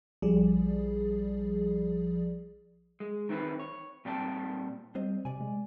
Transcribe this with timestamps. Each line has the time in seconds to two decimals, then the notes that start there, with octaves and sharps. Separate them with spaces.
0.22 A#1 F3 G3 G#4 D5
3.00 G#3
3.29 D#3 E3 C4 E4 B4
3.59 C#5
4.05 A#2 G3 C4 D5 G5 A5
4.95 G3 C4 C5 D#5
5.25 C3 D5 G#5
5.41 G#3